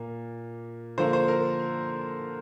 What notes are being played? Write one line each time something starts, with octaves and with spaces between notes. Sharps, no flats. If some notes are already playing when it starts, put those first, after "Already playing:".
Already playing: A#2 A#3
D3 F3 A#3 C5
C5
A#4